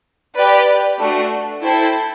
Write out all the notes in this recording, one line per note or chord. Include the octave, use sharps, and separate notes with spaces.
G4 B4 D5
A3 D4 F#4
E4 A4 C5 G5